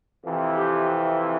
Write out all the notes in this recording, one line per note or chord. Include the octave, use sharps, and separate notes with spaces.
F2 C3 E3
G4